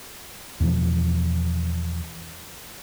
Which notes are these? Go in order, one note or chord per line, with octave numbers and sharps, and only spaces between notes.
E2 B2 E3 F3